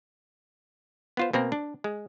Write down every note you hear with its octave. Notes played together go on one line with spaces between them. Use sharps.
B3 F4 C5
B2 A#3 C4 A#4
D4
G#3